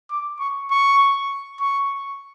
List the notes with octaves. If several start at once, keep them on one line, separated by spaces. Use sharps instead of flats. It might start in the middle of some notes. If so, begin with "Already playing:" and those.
D6
C#6
C#6
C#6